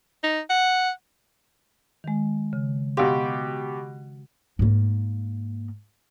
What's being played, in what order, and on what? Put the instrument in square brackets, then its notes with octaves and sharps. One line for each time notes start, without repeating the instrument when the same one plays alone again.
[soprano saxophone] D#4
F#5
[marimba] D#3 G#3
C#3
[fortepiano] B2 G4 [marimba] F#4 F5 C6
[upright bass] G#2 A#3